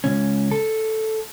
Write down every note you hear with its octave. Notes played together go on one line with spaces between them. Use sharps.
C#2 C#4
A4